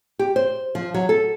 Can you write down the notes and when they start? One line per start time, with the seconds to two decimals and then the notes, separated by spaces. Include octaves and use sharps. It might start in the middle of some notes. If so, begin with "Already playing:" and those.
0.19 G4
0.36 C5
0.75 F3
0.94 F#3
1.09 A4